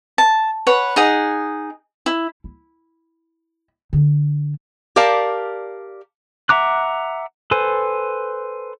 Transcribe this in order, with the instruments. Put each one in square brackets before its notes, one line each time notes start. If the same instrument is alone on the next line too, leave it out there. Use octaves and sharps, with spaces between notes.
[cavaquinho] A5
B4 C#5 F#5
D#4 G#4 F#5
E4
[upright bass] E4
D3
[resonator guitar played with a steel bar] G4 A#4 D5 F5 A5
[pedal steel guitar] E5 F#5 A#5 D6 F#6
A4 B4 C5 G#5